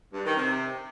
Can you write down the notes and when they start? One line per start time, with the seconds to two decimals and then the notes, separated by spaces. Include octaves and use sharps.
0.13 G2
0.25 D#3
0.36 C3